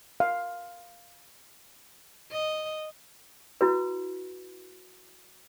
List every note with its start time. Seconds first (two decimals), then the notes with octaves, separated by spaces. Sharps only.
0.20 F5
2.32 D#5
3.61 E4 F#4 B4